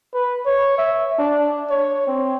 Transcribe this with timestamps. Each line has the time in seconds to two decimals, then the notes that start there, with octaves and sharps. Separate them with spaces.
0.14 B4
0.46 C#5
0.78 E5
1.19 D4
1.70 C#5
2.07 C4